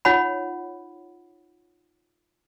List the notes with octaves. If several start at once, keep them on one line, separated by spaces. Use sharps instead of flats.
D#4 F4 C#5 F#5 B5